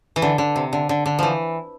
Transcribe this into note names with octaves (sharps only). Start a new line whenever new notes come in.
E3
D3
D3
C3
D3
D3
D3
E3 F3